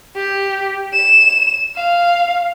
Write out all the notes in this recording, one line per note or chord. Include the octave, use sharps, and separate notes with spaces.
G4
E7
F5